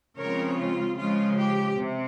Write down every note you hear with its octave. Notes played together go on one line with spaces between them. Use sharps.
C#3 F3 G#3 C4 A#4 C#5
F4
C#3 F3 G#3 F4
G4
C3